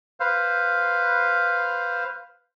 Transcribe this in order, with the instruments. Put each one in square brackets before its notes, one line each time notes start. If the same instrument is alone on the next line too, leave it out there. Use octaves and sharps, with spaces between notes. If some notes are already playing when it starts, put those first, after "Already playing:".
[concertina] B4 C5 F5